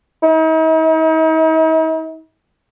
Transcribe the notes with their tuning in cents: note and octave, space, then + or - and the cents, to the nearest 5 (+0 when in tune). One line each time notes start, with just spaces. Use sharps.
D#4 +45